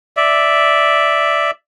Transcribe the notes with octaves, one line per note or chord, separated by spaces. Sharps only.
D5 E5